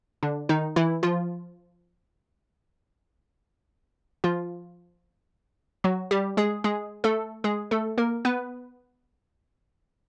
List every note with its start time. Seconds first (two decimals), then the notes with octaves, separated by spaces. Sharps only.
0.23 D3 D4
0.49 D#3 D#4
0.76 E3 E4
1.03 F3 F4
4.24 F3 F4
5.84 F#3 F#4
6.11 G3 G4
6.37 G#3 G#4
6.64 G#3 G#4
7.04 A3 A4
7.44 G#3 G#4
7.71 A3 A4
7.98 A#3 A#4
8.25 B3 B4